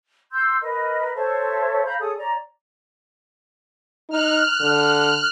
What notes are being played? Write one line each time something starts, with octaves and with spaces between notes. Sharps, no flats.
C6 E6 G6
A#4 B4 D#5
A4 C5 C#5 E5
F5 A#5 B5 G6
G#4 A4 C#5 D#6
C#5 D5 A#5
D#4 F6 F#6
D3